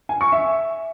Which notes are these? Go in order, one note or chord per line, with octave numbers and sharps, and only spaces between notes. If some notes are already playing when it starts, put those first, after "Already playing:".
G#5
C#6
E5